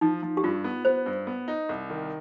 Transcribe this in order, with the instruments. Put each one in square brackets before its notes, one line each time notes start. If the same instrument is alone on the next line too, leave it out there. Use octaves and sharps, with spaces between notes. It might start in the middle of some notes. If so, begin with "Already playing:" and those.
[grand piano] F3 [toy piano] D#4
[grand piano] F3
[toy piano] G4
[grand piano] G2 [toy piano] F4
[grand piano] B3
[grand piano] B3 [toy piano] C5
[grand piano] G2
B3
D#4
C2
D#3